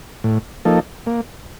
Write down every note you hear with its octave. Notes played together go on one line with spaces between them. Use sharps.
A2
F3 A#3 D#4 A4
A#3